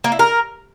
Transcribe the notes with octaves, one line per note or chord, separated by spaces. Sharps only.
A#3
E4
A#4